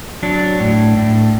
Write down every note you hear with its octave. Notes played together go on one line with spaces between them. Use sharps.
F#3 D4
A2
A2